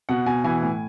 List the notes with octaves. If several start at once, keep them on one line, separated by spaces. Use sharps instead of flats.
B2 F#5
B2 G#5
E3 G#5
A2